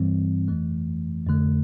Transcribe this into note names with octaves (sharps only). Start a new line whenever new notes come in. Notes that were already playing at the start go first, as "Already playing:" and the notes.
Already playing: G2 E3 G3 C4
F2 E3 A3
F2 D3 A3